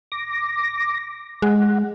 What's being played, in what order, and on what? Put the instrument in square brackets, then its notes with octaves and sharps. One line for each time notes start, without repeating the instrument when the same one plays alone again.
[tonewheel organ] D6 A#6
[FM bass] G#3 [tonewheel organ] F#5